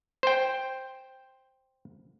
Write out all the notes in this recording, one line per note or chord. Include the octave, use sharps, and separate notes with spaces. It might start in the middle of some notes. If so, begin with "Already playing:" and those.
C5 G5